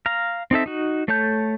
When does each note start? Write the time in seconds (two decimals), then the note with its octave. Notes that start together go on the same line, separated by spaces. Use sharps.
0.06 F5 A#5
0.51 C4 D#4 A4 E5
0.66 D#4 F#4
1.08 A3 A4 C#5 A5 G6